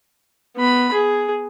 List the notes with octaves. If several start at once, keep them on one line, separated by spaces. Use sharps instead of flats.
B3 B5
G#4